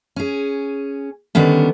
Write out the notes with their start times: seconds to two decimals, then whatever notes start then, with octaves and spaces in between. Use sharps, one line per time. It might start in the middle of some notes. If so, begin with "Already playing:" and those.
0.16 C#4 G#4
1.35 D3 D#3 G3 B3 C#4